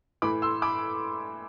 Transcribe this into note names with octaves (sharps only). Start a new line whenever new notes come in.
A2 E3 B5 D6
C6 E6
B5 D6